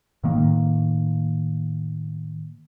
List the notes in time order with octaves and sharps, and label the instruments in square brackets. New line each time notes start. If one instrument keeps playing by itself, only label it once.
[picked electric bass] A2 D#3 A#3